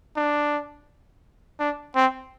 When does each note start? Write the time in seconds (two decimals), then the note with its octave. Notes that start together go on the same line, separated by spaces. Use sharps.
0.17 D4
1.59 D4
1.95 C4